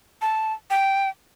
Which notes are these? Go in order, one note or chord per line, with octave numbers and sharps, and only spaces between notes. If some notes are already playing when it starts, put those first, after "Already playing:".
A5
G5